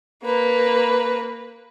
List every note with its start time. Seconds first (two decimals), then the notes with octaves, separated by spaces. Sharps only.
0.24 A#3 B4